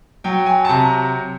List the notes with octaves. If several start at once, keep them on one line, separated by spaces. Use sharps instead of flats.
F#3 G5
G#5
A5
C3 A#5